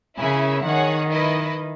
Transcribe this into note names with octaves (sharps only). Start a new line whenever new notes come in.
C#3 C#4 E4 A#4 E5 G#5
D#3 G#4 C#5 F#5
E4 B4 D#5